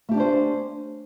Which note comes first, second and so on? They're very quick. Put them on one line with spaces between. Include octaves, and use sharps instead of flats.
A3 G4 D4 C#4 C5